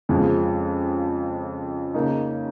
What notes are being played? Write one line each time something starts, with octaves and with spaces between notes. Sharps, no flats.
F2 C#3 F3 G#3
C#3 A#3 D#4